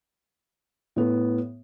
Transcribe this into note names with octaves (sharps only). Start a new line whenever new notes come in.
A2 B3